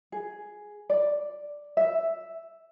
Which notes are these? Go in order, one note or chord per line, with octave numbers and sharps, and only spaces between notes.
G#4
D5
E5